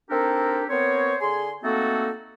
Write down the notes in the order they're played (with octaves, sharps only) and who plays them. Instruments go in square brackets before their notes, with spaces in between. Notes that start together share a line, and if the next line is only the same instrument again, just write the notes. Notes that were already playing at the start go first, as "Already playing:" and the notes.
[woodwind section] C4 D4 D#4 G4 A4 A#4
B3 C4 A#4 C5 C#5
D3 G#4 G#5 C6
A3 A#3 C4 D#4 F#4 A4